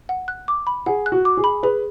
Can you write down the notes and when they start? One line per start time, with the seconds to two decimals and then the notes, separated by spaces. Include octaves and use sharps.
0.09 F#5
0.28 F#6
0.48 D6
0.67 B5
0.86 G#4 F#5
1.06 F#6
1.12 F#4
1.25 D6
1.37 G#4
1.44 B5
1.63 G#4 B4